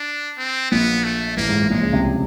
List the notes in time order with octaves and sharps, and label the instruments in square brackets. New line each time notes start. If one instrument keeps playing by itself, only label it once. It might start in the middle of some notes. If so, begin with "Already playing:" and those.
Already playing: [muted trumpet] D4
C4
[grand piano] A#1 A#2 [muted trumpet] B3
[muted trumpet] A3
[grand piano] A1 A2 [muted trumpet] A#3
[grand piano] G#2
A1 A2
[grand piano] A#1 A#2 [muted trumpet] G#3
[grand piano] C#2 C#3
C2 C3